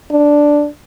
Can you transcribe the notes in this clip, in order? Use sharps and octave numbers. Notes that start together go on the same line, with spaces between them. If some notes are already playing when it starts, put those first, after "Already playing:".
D4